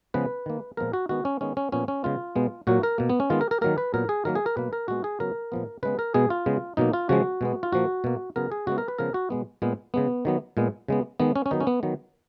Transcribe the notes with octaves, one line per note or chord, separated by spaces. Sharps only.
C#3 F3 G#3 B3 B4
D#3 A#3
A#2 F3 G#3 B3 A#4
F#4
D#3 G#3 B3 F#4
C#4
D#3 G#3 B3 C#4
C#4
A#2 F3 B3 C#4
C#4
C#3 G#3 B3 F4
B2 G#3 B3
A#2 F#3 A#3 F#4
A#4
B2 A#3
B3
C#4
D#3 G#3 B3 F4
A#4
A#4
D#3 F#3 A#3 A#4
B4
A#2 F#3 B3 A#4
G#4
D#3 F#3 A#3 A#4
G#4
A#4
B2 F#3 A#3 B4
A#4
A#2 G#3 B3 F#4
G#4
C#3 F#3 B3 A#4
A#2 F3 B3
C#3 G#3 B3 B4
A#4
B2 G#3 B3 G#4
F4
C#3 G#3 B3
B2 F#3 A#3 D#4
F4
C#3 F3 G#3 F#4
B2 G#3 B3
F4
A#2 F3 A#3 F#4
B2 A#3
C#3 F#3 B3 A#4
G#4
C#3 G#3 B3 F#4
A#4
B4
C#3 F3 G#3 B3 A#4
F#4
B2 G#3 B3
A#2 G#3 B3
C#3 G#3 B3
D#3 F#3 B3
A#2 G#3 B3
C#3 G#3 B3
D#3 G#3 B3
C#4
C#4
D#3 F#3 B3 D#4
C#4
B3
D#3 F#3 B3